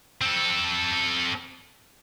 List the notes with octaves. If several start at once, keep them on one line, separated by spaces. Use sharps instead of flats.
C4 A4